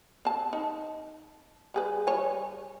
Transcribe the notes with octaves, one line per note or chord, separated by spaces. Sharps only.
C4 A5
D#4
G3 G#4 B4
G3 C#5 G#5